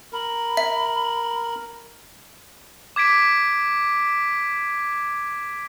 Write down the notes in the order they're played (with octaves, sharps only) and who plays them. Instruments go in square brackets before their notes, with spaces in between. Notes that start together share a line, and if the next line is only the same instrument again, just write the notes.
[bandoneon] A#4 [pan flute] B5
[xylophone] E5
[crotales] D6 G#6 B6 D7